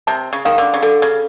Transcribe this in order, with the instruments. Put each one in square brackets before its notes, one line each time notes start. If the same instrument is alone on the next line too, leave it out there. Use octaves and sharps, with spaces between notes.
[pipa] C3 [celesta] A5
[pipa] C#3
[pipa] D#3 [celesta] F5
[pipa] D3
C#3
[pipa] D3 [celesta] A4
[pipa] C#3